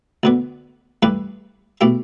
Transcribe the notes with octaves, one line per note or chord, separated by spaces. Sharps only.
D2 D3 B3
G2 E3 A3 G4 B4
B2 A3 E4 G4